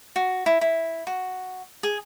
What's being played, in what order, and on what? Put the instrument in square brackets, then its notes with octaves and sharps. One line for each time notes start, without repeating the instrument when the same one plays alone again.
[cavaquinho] F#4
E4
E4
F#4
G#4